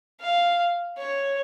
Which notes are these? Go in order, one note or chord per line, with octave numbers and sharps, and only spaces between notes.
F5
C#5